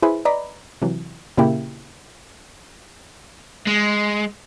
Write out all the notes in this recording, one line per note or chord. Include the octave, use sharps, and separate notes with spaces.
E4 G#4 B4 C5
B4 D5 D#5 A#5 B5
C3 E3 F#3
A#2 C#3 A#3 E4 G4
G#3